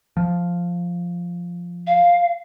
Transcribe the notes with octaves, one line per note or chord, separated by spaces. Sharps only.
F3
F5